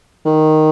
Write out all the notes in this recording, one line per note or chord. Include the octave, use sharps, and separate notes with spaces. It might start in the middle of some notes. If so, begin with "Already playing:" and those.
D#3